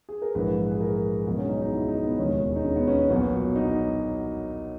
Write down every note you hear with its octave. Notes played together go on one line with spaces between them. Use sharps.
G#4
A#4
A#1 G#2 E3 B4
G#4
A#4
C#2 B2 F#3 G#4
C#4
D#4
D#4
E4
D#4
B3
E1 D#2 C#3 G#3 C#4
D#4
C#4
B3
C#4
C#4
B1 A#2 F#3 B3
D#4